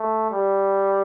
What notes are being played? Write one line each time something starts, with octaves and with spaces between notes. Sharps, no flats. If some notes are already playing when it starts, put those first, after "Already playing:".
Already playing: A3
G3